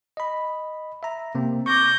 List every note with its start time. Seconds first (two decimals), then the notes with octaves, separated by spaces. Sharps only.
0.17 D#5 B5
1.03 E5 A#5
1.35 C3 A#3 C4
1.66 C#6 D6 G6 A#6